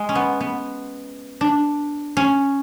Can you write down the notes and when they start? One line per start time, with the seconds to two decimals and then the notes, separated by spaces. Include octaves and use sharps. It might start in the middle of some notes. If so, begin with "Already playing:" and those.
Already playing: G#3
0.09 C#4
0.15 B3
0.41 B3
1.41 D4
2.17 C#4